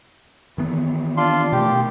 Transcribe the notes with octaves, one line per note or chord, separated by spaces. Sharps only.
D#3 E3 B3
D4 F4 C6
B2 A3 G4